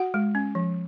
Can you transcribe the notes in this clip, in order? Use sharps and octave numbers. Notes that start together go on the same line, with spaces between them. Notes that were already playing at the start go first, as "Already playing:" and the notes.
Already playing: F#4 F#5
G#3
C#4
F3